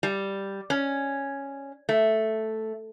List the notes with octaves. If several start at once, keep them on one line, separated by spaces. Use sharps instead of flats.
G3
C#4
A3